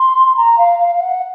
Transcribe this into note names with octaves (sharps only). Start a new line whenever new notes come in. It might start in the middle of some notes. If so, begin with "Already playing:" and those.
Already playing: C6
A#5
F5
F5
F5
F#5